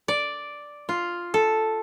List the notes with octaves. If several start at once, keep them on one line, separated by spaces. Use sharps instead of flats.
D5
F4
A4